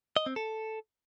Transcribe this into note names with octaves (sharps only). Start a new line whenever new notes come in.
D#5
C4
A4